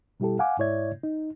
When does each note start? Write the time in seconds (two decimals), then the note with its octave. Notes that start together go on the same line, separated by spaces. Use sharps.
0.20 B2 G3 E4 G4 A4
0.39 F5 F#5 G#5 D6
0.59 G#2 E4 C#5 D5 E5 G#6
1.03 D#4